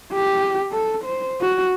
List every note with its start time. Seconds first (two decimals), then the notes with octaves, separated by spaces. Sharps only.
0.13 G4
0.72 A4
1.05 C5
1.41 F#4